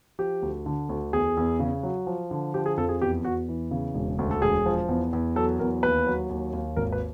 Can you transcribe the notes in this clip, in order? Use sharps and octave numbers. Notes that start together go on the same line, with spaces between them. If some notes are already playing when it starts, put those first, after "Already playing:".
F3 G4
D2
D3
D2
E2 G#4
E2
C#3
F#3
F3
D3
F3 G4
G#4
F2 A4
G#4
E2 G4
E2 F#4
E3
C#3
E1
D2
A4
E1 G#4
F3
E2
E2
F#3 A4
E2 A#4
D#2 B4
F#3
D#2
D#2
G#1 A#4
B4